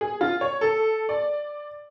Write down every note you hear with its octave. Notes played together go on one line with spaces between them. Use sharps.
G#4
F4
C#5
A4
D5